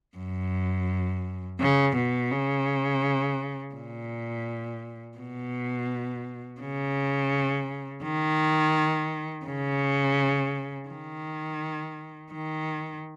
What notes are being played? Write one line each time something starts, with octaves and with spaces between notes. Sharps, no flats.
F#2
C#3
B2
C#3
A#2
B2
C#3
D#3
C#3
D#3
D#3